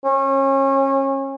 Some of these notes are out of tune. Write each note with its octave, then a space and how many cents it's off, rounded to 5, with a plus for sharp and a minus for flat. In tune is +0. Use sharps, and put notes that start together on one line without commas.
C#4 -30